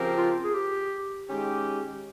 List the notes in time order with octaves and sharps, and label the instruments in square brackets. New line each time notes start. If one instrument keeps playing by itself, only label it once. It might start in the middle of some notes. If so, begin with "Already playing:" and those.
Already playing: [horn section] C#3 F3 C4 G4 A#4
[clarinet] F4
G#4
G4
[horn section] D#3 G#3 C#4 G4